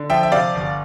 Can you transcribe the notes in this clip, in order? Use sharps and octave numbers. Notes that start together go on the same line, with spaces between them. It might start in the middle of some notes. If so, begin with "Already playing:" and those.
Already playing: D3
F3 E5 G5
E5
C3 D5 F5
G1